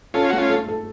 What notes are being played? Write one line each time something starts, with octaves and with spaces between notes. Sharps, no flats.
C#4 F4 A4
A3 F#4
C#4 F4
A4
A4